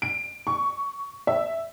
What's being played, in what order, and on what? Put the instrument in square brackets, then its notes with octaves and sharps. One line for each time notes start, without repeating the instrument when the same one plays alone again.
[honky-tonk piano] D7
C#6
E5